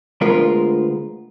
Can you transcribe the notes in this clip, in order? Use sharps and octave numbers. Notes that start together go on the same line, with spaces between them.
D2 G#3 B3 F4 A#4